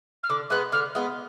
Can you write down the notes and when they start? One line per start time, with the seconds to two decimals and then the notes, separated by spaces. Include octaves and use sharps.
0.23 F6
0.29 D3 D6
0.50 G#3 B3 F#6
0.72 D3 F6
0.95 G#3 B3